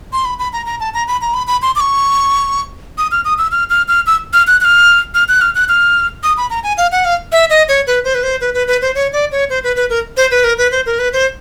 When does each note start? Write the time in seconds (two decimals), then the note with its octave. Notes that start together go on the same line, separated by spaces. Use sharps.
0.13 C6
0.25 B5
0.39 B5
0.53 A#5
0.66 A#5
0.80 A5
0.94 A#5
1.08 B5
1.21 A#5
1.34 B5
1.47 B5
1.62 C6
1.76 D6
1.80 C#6
2.98 D#6
3.12 F6
3.25 D#6
3.38 E6
3.52 F6
3.70 F6
3.88 F6
4.07 E6
4.33 F6
4.47 F#6
4.61 F#6
4.65 F6
5.15 F6
5.29 F#6
5.41 F6
5.55 F#6
5.69 F6
6.23 D#6
6.37 B5
6.50 A#5
6.64 G#5
6.78 F5
6.92 F#5
7.05 F5
7.32 E5
7.50 D#5
7.69 C#5
7.87 B4
8.04 C5
8.15 B4
8.23 C5
8.41 B4
8.54 B4
8.67 B4
8.82 C5
8.95 C#5
9.13 D5
9.32 C#5
9.50 C5
9.64 B4
9.76 B4
9.90 A#4
10.17 C5
10.31 B4
10.44 A#4
10.58 B4
10.71 C5
10.86 A#4
10.99 B4
11.13 C5